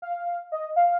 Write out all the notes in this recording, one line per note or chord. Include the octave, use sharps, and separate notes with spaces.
F5
D#5
F5